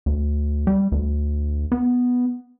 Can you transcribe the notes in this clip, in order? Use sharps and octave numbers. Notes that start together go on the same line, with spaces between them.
D2
G3
D2
B3